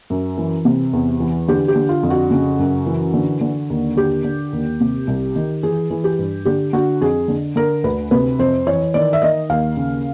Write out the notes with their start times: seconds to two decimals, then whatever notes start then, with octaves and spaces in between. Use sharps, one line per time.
0.10 F#2
0.38 E3
0.65 C3
0.93 E2
1.20 E3
1.48 D3 G4
1.68 G4
1.76 D3
1.89 F4
2.03 F2
2.10 F#4
2.31 C#3
2.59 F#2
2.86 E3
3.14 D3
3.41 D3
3.70 D#2
3.96 D3 G4
4.24 D3
4.53 D#2
4.80 C3
5.07 C2
5.36 D#3
5.63 E3 G#4
5.90 E3
6.04 G4
6.19 G2
6.45 D3 G4
6.73 D3 F#4
7.01 F2 G#4
7.28 D3
7.56 D3 A#4
7.84 D2 B4
8.11 C3 B4
8.39 F2 C5
8.67 E3 C#5
8.94 D#3 D5
9.13 E5
9.22 D#3 D#5
9.50 D#2 F5
9.77 C#3